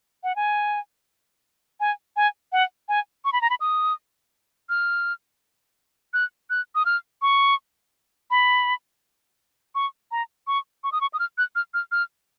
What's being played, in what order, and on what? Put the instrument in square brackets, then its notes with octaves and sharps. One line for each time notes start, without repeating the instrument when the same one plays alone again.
[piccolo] F#5
G#5
G#5
G#5
F#5
G#5
C#6
B5
A#5
B5
D#6
F6
F#6
F#6
D#6
F6
C#6
B5
C#6
A#5
C#6
C#6
D#6
C#6
D#6
F6
F#6
F6
F6
F6